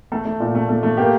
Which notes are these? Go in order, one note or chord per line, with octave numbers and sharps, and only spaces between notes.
A3 A4
A3
A#2
A3
A3
A3
A#3 G4